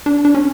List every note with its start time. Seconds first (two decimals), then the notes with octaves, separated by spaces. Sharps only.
0.06 D4
0.25 D4
0.35 C#4